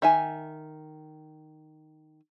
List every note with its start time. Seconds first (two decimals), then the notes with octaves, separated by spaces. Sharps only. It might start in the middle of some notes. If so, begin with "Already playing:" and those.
0.02 D#3 E5 G#5